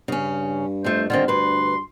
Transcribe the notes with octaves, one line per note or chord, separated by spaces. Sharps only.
G2 C#3 C#4
F2 A3 C5
G2 D3 D#3 C4 F4
D2 B4 C6